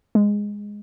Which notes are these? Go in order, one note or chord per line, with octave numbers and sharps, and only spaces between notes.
G#3